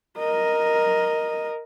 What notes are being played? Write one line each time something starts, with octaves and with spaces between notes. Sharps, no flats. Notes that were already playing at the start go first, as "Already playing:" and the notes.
A#4 D#5